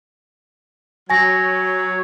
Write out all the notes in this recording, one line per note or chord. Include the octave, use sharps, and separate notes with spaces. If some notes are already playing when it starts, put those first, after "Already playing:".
F#3 C#5 G#5 A#6